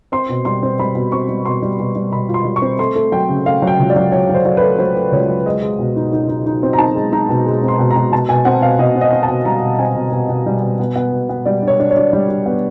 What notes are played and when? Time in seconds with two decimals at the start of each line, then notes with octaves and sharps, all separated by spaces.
0.12 C4 C6
0.29 B2
0.45 G3 C6
0.63 C4
0.79 G3 B5
0.95 B2
1.12 C4 C#6
1.29 G3
1.45 B2 C6
1.62 G3
1.79 B2
1.96 G3
2.12 B2 B5
2.29 F4
2.34 C6
2.45 G3
2.56 C#6
2.62 C4
2.79 A3 C6
2.95 A3
3.12 F#3 G5
3.29 C#3
3.46 A3 F5
3.62 F#3
3.67 G5
3.79 C#2
3.90 D5
3.96 F#3
4.12 F#3 C#5
4.29 F#3
4.35 C5
4.45 F#3
4.57 A3 B4
4.78 F#3 C5
4.96 A3
5.12 C#2 C#5
5.29 F#3
5.46 G#3 D#5
5.62 G#3
5.79 B2
5.96 D#4
6.13 D#4
6.28 D#4
6.46 D#4
6.63 C4
6.73 A#5
6.78 D#4 A5
6.95 G#3
7.12 D#4 A#5
7.29 B2
7.46 G#3
7.63 C4
7.68 C6
7.79 B2
7.91 A#5
7.96 B2
8.12 B2 A5
8.29 B2 G#5
8.45 C4 F#5
8.62 B2 F5
8.79 B2 D#5
8.95 C4
9.01 D#5
9.12 C4
9.23 A5
9.28 B2
9.45 G3 A#5
9.62 B2
9.79 C4 G#5
9.95 B2
10.12 B2
10.29 B2
10.46 G3
10.62 B2
10.79 B3
10.96 B3
11.13 B2
11.29 B3
11.45 G3 D5
11.62 D4
11.68 C#5
11.80 D4
11.91 C#5
11.96 D4
12.13 G3
12.28 D4
12.46 B3